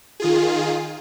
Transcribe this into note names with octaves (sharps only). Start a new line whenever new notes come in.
D#3 F4 G#4